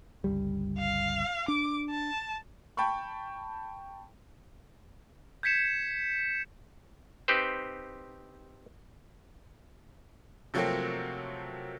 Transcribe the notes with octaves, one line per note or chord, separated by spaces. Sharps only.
G1 C#2 G3
F5
D4 D6
A5
G5 A5 B5 C#6
G6 G#6 B6 C#7 E7
C4 D#4 G4 B4 C5
C3 F3 F#3 A3 A#3 C4